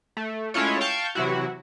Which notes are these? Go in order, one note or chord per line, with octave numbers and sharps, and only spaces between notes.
A3
G#3 A3 C#4 E4 F4 C#5
F5 G5 A5 C#6 G6
C3 E3 F#3 E4 F#4